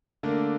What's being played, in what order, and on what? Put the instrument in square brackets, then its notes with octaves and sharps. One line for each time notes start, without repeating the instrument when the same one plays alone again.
[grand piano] D3 A3 A#3 D4 A#4